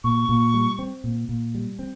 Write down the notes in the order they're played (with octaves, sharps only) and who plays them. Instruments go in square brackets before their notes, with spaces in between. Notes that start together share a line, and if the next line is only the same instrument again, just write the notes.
[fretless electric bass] A#2 [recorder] C#6
[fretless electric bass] A#2
G3
C4
A#2
A#2
G3
C4